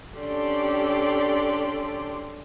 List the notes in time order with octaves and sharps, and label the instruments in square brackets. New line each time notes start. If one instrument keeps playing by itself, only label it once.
[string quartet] C#4 D4 G4 A4 D5 C6